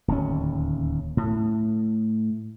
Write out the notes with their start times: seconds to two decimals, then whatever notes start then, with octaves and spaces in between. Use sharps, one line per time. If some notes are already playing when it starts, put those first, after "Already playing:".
0.08 D1 D#2 C#4
1.17 A2